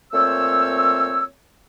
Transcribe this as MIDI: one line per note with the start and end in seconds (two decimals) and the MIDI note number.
0.13 1.24 46
0.13 1.24 57
0.13 1.24 60
0.13 1.24 72
0.13 1.24 73
0.13 1.24 88